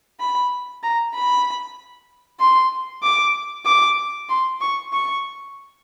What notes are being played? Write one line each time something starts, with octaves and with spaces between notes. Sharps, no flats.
B5
A#5
B5
C6
D6
D6
C6
C#6
C#6